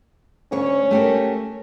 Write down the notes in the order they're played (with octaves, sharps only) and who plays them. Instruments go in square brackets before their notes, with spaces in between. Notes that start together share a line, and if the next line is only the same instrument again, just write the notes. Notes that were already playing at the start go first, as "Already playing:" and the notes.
[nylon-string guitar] D2 C#5 [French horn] C#4
[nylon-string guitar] A3 G4 A#4